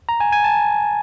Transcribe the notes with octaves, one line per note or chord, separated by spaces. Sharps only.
A#5
G#5
G#5
A5